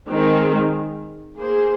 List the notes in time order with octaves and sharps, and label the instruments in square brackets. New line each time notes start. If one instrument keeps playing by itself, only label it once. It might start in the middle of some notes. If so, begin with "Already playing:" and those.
[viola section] D#3 G#3 C4
A#3 G#4 C5